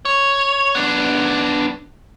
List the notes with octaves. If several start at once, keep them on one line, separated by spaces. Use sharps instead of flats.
C#5
B3 D4